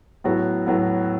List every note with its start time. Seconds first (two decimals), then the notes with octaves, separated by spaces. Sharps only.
0.24 A2 F#3 B3 F#4
0.67 A2 F#3 B3